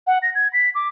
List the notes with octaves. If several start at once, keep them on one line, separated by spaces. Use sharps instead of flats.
F#5
A#6
G#6
B6
D6